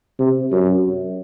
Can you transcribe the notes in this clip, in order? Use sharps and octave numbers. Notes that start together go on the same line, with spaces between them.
C3
F#2